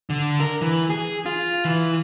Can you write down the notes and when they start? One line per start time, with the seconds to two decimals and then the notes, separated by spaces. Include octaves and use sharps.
0.10 D3
0.40 A#4
0.62 E3
0.90 G#4
1.26 F4
1.65 E3